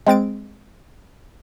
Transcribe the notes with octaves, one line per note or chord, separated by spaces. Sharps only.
G#3 C4 A6 D7